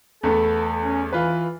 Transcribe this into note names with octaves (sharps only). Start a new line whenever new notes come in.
E2 A3 B3 A4
C#4
E3 F4 B4